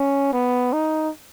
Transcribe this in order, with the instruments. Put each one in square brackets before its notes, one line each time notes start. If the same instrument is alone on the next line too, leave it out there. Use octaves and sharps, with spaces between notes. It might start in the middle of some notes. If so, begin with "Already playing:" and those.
Already playing: [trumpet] C#4
B3
D#4